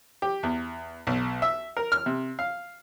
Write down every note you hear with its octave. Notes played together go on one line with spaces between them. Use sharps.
G4
E2
B1
E5
A#4
F6
C3
F5